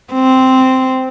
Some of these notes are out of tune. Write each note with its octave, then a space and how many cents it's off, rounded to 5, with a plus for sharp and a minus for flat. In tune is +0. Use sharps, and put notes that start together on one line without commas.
C4 -5